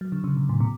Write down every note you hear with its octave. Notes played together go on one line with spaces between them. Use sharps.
F#3
D3
C#3
B2
A2
B2